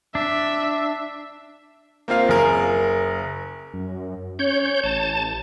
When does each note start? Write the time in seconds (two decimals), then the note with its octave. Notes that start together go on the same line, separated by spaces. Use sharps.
0.15 D4 E5
2.08 A#3 C4 F4 F5
2.28 F#1 G#4 A#4
3.73 F#2
4.39 C#4 C#5 G6
4.83 A1 A5